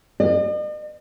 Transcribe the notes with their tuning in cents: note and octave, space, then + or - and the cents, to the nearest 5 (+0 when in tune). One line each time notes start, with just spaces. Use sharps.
D#5 -45